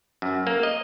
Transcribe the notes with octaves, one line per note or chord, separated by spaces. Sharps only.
F#2
A#3
D#5